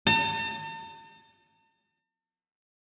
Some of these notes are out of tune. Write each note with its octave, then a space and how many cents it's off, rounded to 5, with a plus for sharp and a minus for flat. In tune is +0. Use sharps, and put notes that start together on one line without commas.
A5 +45